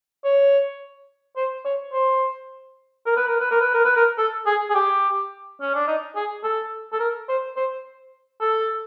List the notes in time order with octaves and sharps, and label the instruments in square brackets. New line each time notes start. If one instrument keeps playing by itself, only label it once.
[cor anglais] C#5
C5
C#5
C5
A#4
B4
A#4
B4
A#4
B4
A#4
B4
A#4
A4
G#4
G#4
G4
C#4
D4
D#4
G#4
A4
A4
A#4
C5
C5
A4